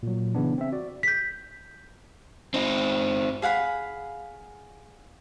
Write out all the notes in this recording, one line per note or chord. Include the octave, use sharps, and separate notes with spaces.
A#2 F#3
C#3 E3 B3 D4
C4 E5
F#4 D5
G6 B6
C4 D#4
G#4 F5 F#5 B5